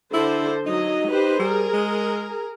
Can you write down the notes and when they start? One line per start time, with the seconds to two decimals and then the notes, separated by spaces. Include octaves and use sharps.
0.13 D3 E4 A4 C5
0.66 F#3 D#4 D#5
1.08 G4 B4 C5
1.39 G3 G#4 A#4
1.73 G#3